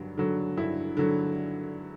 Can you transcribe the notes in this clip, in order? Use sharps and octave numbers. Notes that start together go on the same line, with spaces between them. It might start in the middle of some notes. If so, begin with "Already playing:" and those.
Already playing: G2 D3 F#3
D3 F#3
G2 E4
D3 F#3